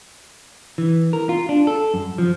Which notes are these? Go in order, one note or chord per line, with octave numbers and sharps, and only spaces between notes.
E3
A#4
F4
D4
A4
F#2
F3